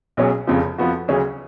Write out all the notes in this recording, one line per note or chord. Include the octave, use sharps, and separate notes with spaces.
B1 B2 F#3 C#4 G#4
F1 F2 C#3 F3
F2 F3 B3 F#4
D2 C#3 F#3 C#4 G#4